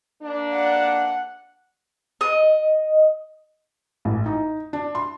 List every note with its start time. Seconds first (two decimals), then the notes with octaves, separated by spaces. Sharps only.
0.22 A#3 D4
0.56 F#5
2.21 D#5
4.05 A1
4.26 D#4
4.73 D4
4.95 C6